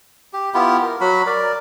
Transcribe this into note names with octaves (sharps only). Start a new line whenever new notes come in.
G4
B3 E4 F4 G4
A#4
F#3 F#4 B5
A#4 D5